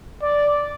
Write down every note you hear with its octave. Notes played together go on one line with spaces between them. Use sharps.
D5